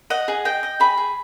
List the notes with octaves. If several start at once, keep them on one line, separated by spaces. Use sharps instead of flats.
D#5 F#5
G#4
D#5 G5
D#5
G#4 B5
G#4